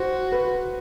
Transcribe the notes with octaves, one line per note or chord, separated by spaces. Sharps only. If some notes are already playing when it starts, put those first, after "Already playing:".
Already playing: F#4 C5
B4